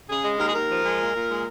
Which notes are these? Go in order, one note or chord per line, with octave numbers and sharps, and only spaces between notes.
C#3 G#4
G#3
D#2 A#4
G#4
D#2 A#4
F3
G#3
A#2
A#2
G#3